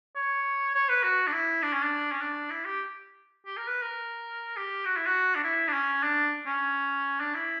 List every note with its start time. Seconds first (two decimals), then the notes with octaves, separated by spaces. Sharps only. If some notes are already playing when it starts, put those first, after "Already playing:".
0.16 C#5
0.75 C#5
0.89 B4
1.03 F#4
1.27 D4
1.32 E4
1.62 D4
1.73 C#4
1.83 D4
2.12 C#4
2.21 D4
2.50 E4
2.65 G4
3.46 G4
3.57 A#4
3.68 B4
3.82 A#4
4.56 G4
4.85 F#4
4.96 E4
5.06 F#4
5.35 D4
5.44 E4
5.68 D4
5.73 C#4
6.03 D4
6.46 C#4
7.20 D4
7.35 E4